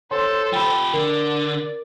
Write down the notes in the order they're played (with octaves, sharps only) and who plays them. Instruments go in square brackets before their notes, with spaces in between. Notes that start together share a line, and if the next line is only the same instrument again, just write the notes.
[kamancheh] A4 C5 [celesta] C#5 C6
[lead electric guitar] F3 G4 [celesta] G5 B5
[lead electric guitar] D3 [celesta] A#4 [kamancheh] D5